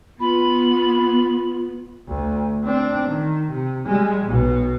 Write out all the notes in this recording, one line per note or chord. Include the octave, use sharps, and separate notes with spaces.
B3 F4 B5
D2
C4 D4
D#3
C3
G3 G#3
B1 B2